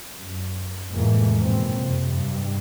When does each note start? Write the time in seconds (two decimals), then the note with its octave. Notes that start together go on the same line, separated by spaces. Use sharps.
0.17 F#2
0.89 F1 F2 A2 E3 G#3 A#3
1.39 F#1 G#2 B2 C4
1.75 F2 C3
2.12 G2